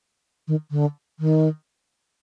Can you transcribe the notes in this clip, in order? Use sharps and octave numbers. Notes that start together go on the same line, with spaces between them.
D#3
D3
D#3